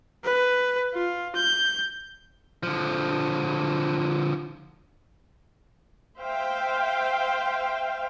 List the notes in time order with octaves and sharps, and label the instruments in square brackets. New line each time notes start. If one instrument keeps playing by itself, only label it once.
[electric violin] B4
F4
G6
[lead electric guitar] D3 F3
[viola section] C5 E5 F5 G5